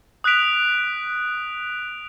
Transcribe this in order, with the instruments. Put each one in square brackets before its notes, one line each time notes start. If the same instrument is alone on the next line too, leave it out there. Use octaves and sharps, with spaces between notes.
[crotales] D#6 F#6 B6 D7 F7